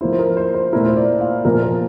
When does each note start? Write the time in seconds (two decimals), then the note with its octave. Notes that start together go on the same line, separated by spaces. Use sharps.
0.01 F3 A#3 E4 C5
0.12 C5
0.19 A#4
0.37 C5
0.54 C5
0.73 A#2 A3 E4 A#4
0.86 C5
0.96 D5
1.21 F5
1.45 A#2 F3 A#3 A#4
1.63 A#4